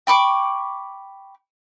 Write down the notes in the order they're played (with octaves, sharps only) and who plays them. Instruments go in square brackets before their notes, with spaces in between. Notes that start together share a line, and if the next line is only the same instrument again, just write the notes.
[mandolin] G5 B5 C#6 D6